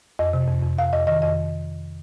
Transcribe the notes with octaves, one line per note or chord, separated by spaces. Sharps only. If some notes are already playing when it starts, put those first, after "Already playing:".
F2 D#5
C3
F2
F2
F2 F5
F2 D#5
D#3 D#5
F2 D#5